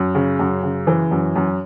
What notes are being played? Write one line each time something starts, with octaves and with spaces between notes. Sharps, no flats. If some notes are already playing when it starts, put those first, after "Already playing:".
Already playing: F#2
C#3
F#2
C#3
E3
F#2
F#2